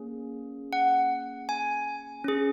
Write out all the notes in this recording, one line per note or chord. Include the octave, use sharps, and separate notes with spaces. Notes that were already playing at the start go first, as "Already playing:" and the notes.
Already playing: A#3 C#4 G#4
F#5
G#5
C#4 G#4